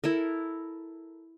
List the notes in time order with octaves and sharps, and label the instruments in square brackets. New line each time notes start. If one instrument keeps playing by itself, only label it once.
[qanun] E4 A4 A#4